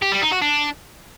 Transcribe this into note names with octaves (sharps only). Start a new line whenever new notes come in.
G4
G3
D#4
F#4
D4